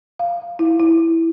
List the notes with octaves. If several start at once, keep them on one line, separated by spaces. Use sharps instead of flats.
F5
F5
E4
E4